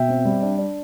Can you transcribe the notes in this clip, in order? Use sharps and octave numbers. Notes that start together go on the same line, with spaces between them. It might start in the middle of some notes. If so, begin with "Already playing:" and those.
Already playing: B2 E5 G5
C4
G3
D4
D4